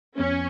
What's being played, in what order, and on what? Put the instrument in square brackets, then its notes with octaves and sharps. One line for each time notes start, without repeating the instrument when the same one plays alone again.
[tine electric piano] F2 F3 B3 [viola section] C#4